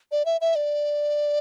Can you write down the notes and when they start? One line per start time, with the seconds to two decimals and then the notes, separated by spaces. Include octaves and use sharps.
0.12 D5
0.25 E5
0.41 E5
0.55 D5